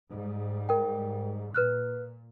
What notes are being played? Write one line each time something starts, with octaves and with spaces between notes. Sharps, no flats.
G#2 G3
A#4 G5
A#2 B4 F6 F#6